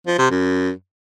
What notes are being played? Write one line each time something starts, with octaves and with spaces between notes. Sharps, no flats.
F3
C3
F#2